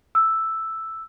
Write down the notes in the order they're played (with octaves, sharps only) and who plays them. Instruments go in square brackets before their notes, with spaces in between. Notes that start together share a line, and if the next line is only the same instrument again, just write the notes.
[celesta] E6